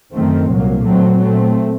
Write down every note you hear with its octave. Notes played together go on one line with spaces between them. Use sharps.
F#2 D#3 A3 C4
C2 A#2 F#3 A#3
A#2 F#3 A3 C4
A#2 A3 C4